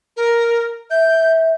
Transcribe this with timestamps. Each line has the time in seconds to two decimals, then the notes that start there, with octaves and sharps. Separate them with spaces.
0.17 A#4
0.91 E5 G6